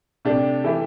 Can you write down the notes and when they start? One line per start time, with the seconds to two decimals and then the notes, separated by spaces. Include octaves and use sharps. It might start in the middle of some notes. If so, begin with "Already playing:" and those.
0.25 C3 A3 D4 G4
0.64 E3 A3 E4 G4